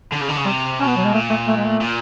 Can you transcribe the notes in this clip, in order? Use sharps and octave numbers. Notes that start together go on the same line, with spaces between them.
D3
C#3
D3
C#3
C3 G3
B2 C#4
B3
F#3
G#3
A#2 A3
A3
A3
G#3
A3
A#2